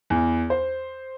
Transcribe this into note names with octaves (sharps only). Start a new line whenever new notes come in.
E2
C5